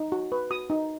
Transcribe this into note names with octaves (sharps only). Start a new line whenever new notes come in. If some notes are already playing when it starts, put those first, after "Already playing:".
Already playing: D#4
F#4
B4
F#4 D#6
D#4